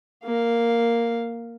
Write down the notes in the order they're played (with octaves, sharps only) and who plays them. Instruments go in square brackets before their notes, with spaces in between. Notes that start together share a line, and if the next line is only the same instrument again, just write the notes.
[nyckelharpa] A#3 F5